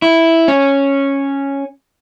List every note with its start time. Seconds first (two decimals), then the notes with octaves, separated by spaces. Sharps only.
0.02 E4
0.48 C#4